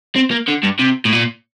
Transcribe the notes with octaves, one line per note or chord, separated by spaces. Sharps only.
C4
A#3
D3
G2
C3
A2
A#2